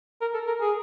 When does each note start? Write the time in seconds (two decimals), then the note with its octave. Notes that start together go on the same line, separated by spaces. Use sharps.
0.21 A#4
0.34 A4
0.47 A#4
0.61 G#4